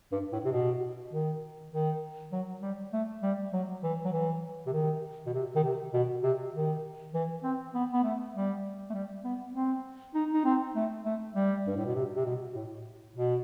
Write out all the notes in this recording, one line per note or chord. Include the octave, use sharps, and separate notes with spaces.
G2
A2
C3
B2
D#3
D#3
F#3
G3
A3
G3
F#3
E3
F#3
E3
C3
D#3
B2
C3
D#3
C3
B2
C3
D#3
E3
C4
B3
B3
A3
G3
A3
G3
B3
C4
D#4
D#4
C4
A3
A3
G3
G2
A2
B2
C3
C3
B2
A2
B2